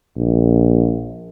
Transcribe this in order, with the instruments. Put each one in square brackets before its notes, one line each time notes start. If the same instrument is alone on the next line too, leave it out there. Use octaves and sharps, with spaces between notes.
[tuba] A#1